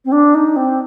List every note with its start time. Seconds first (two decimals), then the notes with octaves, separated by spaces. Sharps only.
0.05 C4
0.12 D4
0.35 D#4
0.56 C4